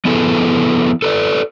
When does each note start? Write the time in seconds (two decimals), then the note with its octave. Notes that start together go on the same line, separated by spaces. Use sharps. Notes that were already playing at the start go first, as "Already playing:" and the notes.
0.05 F3 B3 E4 G#4 A4 B4
1.02 A4 B4 D5